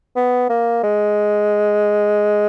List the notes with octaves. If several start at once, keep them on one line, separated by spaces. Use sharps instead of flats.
B3
A#3
G#3